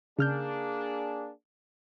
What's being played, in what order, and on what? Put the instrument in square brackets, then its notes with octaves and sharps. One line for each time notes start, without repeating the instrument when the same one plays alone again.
[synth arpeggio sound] C#3 F6 G6 [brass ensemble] A#3 D4 G#4